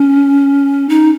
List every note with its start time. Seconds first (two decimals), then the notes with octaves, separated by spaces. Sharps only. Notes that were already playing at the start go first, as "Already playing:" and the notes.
Already playing: C#4
0.89 D#4